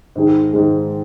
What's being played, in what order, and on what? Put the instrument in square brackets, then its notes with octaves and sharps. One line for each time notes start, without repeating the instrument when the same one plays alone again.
[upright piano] G#2 D#3 G#3
G#2 D#3 G#3